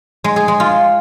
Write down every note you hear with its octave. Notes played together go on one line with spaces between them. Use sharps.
G#3
G#4
G#3
F4